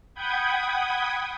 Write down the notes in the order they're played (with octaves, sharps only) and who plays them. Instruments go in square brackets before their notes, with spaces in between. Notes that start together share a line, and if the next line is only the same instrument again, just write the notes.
[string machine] F#5 G5 B5 D#6 G6 G#6